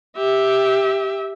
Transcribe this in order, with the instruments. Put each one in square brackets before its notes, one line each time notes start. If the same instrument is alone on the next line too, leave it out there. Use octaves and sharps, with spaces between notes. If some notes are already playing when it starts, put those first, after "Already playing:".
[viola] G4 E5